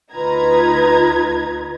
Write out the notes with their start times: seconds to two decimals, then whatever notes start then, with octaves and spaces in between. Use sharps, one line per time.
0.14 D2 D#4 F4 B4 A#5 G#6